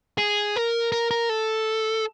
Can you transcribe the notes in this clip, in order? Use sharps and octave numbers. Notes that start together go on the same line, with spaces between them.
G#4
A#4
A#4
A#4
A4